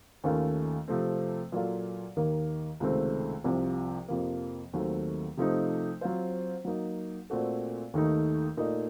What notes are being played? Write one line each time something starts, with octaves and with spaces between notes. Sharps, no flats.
D#2 D#3 A3 C#4 F4
C3 F3 A3 C4
A#2 F#3 A#3 F4 A4
D#2 D#3 A#3
C#2 C3 D#3 A3 C4
C2 C3 F3
F2 C3 F3 A#3
D#2 D#3 F#3 A3 C4
C3 F3 A3 D#4
F#3 C4 F4 C5
F#3 A#3 D#4
A#2 A3 C4 F#4 A4
D#2 D#3 A3 D#4
A#2 A3 D#4 A#4 D#5